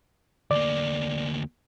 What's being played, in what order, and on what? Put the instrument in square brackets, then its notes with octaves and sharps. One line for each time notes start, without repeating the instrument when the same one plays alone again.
[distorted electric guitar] D2 A#3 [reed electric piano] D5